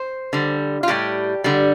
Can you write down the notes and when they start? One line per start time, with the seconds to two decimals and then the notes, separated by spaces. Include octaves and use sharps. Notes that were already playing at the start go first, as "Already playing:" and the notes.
Already playing: C5
0.33 D3 G3
0.83 F4
0.88 A2 G3 G4
1.44 D3 G3